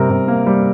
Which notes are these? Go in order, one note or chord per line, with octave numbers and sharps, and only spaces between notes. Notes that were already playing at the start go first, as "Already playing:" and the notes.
Already playing: C3 G3 A#4
C3
A#3
G3